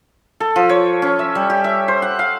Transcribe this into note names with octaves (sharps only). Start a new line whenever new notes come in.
A4
F3
C#5
C#4
E5
G3
G4
E5
C5
F#5
F5